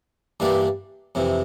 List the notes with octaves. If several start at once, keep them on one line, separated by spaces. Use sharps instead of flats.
G2 E3 G3 A#3 D4
F2 C3 E3